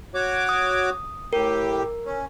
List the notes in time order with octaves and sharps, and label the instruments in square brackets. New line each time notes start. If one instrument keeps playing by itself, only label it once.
[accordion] F#4 C#5 D6
[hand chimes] D#6
[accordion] A2 G4 [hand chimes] A#4
[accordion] C#4